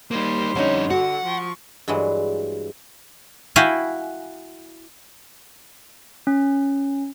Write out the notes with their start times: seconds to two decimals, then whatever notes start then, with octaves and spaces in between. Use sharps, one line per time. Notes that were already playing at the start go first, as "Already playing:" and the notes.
0.11 G3 A#3 D#4 C5
0.55 F2 D3 C#4 D#4 C#5
0.90 D3 F#4 F#5
1.24 F3 C#6
1.88 G2 E3 F#3 G#3
3.56 E4 F#4 E5 F5 G5 G#5
6.27 C#4